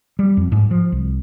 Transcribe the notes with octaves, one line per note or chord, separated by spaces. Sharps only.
G3
F2
G#2
F3
C2